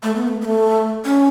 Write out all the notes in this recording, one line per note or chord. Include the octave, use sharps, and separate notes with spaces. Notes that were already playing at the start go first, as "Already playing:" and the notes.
A3
B3
A3
B3
A3
C#4